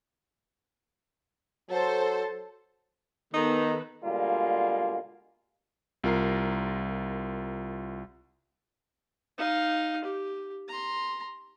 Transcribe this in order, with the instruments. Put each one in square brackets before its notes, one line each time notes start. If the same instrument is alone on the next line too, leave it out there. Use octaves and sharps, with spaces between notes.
[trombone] F#3 [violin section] A4 C5
[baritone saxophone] D#3 [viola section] B3 A4 B4 [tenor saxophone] D#4
[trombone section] B2 D3 G3 G#3 A#3 F4
[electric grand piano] C2 F4 A#4 A#5 C7
[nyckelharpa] D#4 F5
G4
A#5 C6